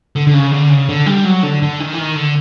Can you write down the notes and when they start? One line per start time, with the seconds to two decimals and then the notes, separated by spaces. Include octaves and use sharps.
0.16 D3
0.27 D3
0.34 C#3
0.52 D3
0.70 C#3
0.89 D3
1.06 G3
1.25 F#3
1.43 D3
1.62 D3
1.80 D#3
1.93 E3
1.98 D#3
2.16 D3